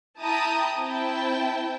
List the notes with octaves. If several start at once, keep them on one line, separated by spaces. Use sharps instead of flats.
E4 G5 A5 A#5 D#6
C4 E4 G5 A5